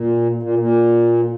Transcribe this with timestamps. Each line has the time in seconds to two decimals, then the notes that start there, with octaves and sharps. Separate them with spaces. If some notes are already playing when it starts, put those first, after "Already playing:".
Already playing: A#2
0.43 A#2
0.59 A#2